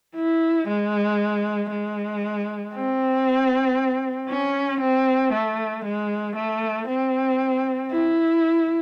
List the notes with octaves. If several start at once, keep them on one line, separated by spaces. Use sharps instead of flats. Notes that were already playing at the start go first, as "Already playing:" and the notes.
E4
G#3
G#3
C4
C#4
C4
A3
G#3
A3
C4
E4